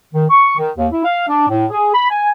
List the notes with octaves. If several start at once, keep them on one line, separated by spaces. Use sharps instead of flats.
D#3
C#6
D#3
D#2
E4
F5
D4
A2
G#4
B5
G#5